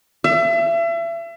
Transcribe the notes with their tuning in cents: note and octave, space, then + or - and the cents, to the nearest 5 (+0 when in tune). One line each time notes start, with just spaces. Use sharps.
E5 +35